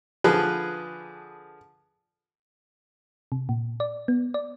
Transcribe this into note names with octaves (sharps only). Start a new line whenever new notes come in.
D3 F3 G#4 B4
C3
A#2
D5
B3
D5